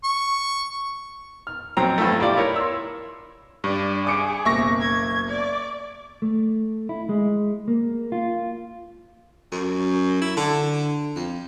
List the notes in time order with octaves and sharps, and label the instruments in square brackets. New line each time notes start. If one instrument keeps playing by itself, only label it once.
[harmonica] C#6
[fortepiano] F6
F2 F#3 C4 A#5
G2 F3 A3
E4 F4 G4 D5
E4 A#4 C#5
C6 E6
[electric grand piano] G2 [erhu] D5
[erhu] G#4 [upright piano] D6 C#7 D7
[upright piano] F#1 B1 [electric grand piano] E5 C#6 A#6
[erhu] G#6
D5
[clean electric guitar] A3
E4
G#3
A#3
F4
[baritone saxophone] F#2
E4
D3
F2